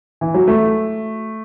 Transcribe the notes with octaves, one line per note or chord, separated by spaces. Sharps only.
E3
F#3
A3